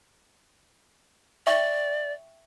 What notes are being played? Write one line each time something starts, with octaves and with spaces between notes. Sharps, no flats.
D5 E5 G5 C#6